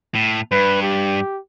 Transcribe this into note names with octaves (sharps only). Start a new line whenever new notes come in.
A2
G2 B4
G4